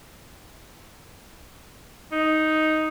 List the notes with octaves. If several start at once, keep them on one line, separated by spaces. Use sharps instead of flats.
D#4